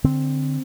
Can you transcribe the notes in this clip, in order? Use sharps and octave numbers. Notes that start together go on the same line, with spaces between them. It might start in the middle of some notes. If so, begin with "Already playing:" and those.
D3 C4